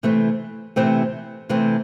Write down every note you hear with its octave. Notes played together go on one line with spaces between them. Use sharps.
C3 E3 A3 C4
C3 E3 A3 C4
C3 E3 A3 C4